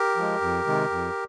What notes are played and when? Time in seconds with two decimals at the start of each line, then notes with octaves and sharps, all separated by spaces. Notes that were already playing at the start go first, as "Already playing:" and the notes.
Already playing: G4 A#4
0.17 F3 G#3
0.41 F2
0.66 C3 D#3 G#3
0.90 F2